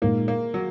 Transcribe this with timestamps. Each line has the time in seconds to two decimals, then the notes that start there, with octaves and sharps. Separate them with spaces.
0.02 A#2 G#3 A#3 D#4 A#4
0.28 A#3
0.54 F#3